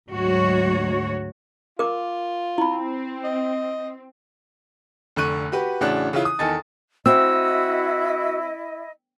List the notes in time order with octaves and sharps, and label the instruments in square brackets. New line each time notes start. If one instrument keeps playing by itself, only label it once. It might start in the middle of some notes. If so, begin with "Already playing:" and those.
[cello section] D2 G#2 F#3 F#4 C#5
[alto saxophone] F4 [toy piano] A#4 D6
[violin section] C4 [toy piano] E4 B5
[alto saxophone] D#5
[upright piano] F1 D3 C#6 F#6 D#7
F#4 G4 B4
A1 C#3 D4 F#4 F#6
C#3 E3 C#4 E4 F4
D#6
E2 D#3 A4 D#5 G#5 A6
[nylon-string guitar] C4 [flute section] E4 D#5 [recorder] F#4 [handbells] E6